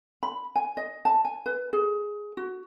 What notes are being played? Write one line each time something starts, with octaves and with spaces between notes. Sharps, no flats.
B5
G#5
D#5
A5
G#5
B4
G#4
F#4